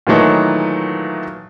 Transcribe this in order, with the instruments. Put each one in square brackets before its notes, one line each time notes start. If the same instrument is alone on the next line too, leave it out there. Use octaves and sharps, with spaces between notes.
[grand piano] A#2 D#3 E3 F#3 A3 D#4